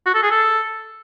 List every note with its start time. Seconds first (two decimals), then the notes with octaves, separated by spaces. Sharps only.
0.06 F#4
0.15 A4
0.23 G#4
0.31 A4